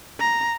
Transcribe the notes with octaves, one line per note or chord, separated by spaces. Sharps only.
A#5